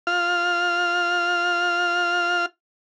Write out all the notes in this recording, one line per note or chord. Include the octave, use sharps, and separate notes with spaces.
F4 F6